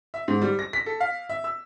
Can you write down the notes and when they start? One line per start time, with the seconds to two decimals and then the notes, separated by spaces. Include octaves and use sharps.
0.14 E5
0.28 G#2
0.42 G3
0.59 A#6
0.73 B6
0.86 A4
1.00 F5
1.29 E5
1.44 E6